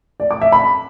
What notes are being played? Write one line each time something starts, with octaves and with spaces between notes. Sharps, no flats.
D5
D6
E5
B5